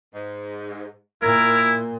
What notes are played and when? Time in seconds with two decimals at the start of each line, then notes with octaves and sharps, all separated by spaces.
0.14 G#2
1.23 A#2 E4 A#4